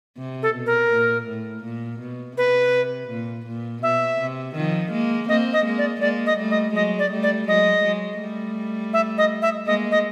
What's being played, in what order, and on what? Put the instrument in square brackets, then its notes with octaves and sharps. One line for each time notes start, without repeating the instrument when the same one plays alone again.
[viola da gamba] C3
[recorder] A4
[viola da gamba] B2
[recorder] A#4
[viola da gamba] A#2
A2
A#2
B2
[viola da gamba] C3 [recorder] B4
[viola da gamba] A#2
A#2
[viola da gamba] B2 [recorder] E5
[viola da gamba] C3
D#3 F3
G#3 A#3
[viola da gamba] A#3 C4 [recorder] D#5
[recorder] D#5
[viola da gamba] G#3 A#3
[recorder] D5
[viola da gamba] G#3 A#3 [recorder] D5
[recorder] D#5
[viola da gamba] G3 A3
[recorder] D#5
[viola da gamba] F#3 G#3 [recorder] D#5
[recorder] D5
[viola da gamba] G3 A3
[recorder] D5
[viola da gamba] F#3 G#3 [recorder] D#5
[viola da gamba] F#3 G#3
G3 A3
[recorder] E5
D#5
E5
[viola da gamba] G#3 A#3 [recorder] D#5
[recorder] D#5